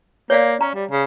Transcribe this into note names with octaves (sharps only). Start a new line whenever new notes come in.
A#3 C#5 D5 F5
C#4 A#5
G3
C#3